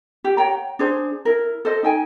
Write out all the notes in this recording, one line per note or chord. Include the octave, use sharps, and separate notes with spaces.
G4
C#5 F#5 G5 A#5
D4 G#4 C5
E4 A#4
A4 C5 D#5
D#4 G5 G#5